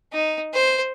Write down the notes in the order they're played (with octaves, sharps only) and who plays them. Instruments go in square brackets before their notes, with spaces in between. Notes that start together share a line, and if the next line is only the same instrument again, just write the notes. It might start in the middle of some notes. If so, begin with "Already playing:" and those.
[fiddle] D#4
C5